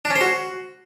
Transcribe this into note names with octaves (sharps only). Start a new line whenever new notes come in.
D4
C#4
C5
F#4